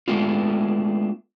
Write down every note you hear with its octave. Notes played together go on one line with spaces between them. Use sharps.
G#3 A3 B3 D4 F4